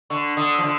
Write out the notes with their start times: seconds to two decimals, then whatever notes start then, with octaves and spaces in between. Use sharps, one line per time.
0.10 D3 C#6
0.37 D3 D#6
0.55 F3 E6
0.64 D3